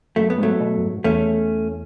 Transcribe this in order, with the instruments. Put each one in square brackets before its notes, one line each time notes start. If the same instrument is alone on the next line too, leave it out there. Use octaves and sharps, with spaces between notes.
[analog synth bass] F#2 [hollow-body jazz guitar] A3
[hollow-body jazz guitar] B3
[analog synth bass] G#2 [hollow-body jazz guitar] F#3 A3
[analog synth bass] B2
F#2
G#2
[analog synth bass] E2 [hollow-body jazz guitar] A3 C#4